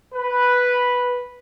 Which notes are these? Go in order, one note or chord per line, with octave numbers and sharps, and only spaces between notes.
B4